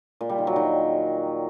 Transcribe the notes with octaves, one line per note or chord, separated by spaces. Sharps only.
A#2
G3
D#3
F#3
D#3